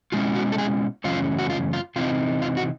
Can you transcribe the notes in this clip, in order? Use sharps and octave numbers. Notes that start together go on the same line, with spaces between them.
B2 G#3 C#4 E4 F4
F#4
A4
G#4
F#2 C#3 E3 A3 C#4 F4
F#4
F4
F4
C3 E3 G#3 C4 D#4 F4
F4
F#4